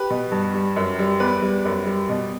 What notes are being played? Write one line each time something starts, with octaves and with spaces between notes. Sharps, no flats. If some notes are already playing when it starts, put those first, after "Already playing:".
Already playing: G4 B4
B2
G2
G3
F#2
G3
E2 B4 D5
G3
F#2
G3
B2